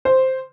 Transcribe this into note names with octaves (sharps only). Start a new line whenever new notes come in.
C5